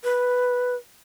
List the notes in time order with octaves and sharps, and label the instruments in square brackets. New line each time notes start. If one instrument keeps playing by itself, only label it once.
[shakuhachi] B4